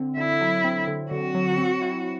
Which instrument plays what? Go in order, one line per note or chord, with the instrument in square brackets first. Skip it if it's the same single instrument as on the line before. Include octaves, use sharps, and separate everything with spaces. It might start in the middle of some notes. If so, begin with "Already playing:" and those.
Already playing: [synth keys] D3 C4
[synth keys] D3 [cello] E4
[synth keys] F#3
C4
D3
[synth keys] D3 [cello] F#4
[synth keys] F#3
C4
E4